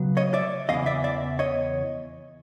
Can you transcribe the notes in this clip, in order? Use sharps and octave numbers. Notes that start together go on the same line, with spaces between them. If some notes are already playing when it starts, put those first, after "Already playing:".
Already playing: C#3 F#3 B3
C#5 D#5
D5 E5
E2 C#3 E3 D#5 F5
D5 E5
D5 E5
C#5 D#5